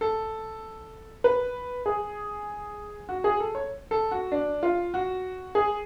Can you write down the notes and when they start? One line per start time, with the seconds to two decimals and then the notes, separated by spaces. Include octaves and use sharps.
0.01 A4
1.24 B4
1.86 G#4
3.09 F#4
3.24 G#4
3.40 A4
3.55 C#5
3.91 A4
4.11 F#4
4.32 D4
4.63 F4
4.94 F#4
5.55 G#4